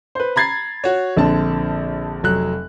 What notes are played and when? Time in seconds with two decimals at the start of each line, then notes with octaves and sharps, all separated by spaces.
0.15 B4 C5
0.36 A#5 B5 G#6 A6 C7
0.84 F#4 C#5
1.17 A#1 D3 C4 A5
2.23 F1 F#3 F#6